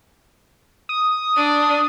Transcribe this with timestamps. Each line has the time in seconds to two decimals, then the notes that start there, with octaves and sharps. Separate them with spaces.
0.89 D#6
1.37 D4